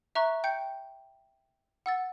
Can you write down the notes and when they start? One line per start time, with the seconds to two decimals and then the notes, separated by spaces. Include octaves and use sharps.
0.15 E5 A#5 C#6 F#6
0.44 G5 G6 C#7
1.86 F#5 E6 A6